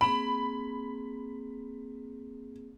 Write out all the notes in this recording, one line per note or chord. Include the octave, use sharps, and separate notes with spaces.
A#3 C4 G#4 B5